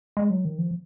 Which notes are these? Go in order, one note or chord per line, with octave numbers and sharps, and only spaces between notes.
G#3
F#3
D#3
F3